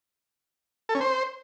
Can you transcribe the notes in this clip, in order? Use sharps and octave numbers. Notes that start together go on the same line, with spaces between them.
A4
C#4
C5